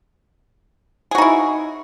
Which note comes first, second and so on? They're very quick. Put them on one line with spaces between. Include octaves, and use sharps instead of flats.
G#4 F#4 D#4 E4